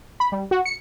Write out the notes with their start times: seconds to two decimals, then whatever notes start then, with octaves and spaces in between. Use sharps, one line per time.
0.20 B5
0.32 G3
0.51 F#4
0.65 C#7